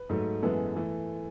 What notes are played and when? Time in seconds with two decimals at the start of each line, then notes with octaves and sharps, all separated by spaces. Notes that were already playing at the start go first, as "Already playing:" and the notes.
Already playing: B4
0.09 G#2 F#3 A3
0.42 F#2 E3 G#3 B3 A4
0.77 E3 A3